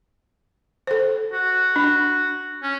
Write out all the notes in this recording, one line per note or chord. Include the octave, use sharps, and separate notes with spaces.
A4 C5
F#4
D4
C#4